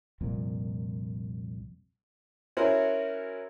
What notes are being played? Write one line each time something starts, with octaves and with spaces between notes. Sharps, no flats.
C2 F2 A#2
C#4 E4 F#4 A#4 C5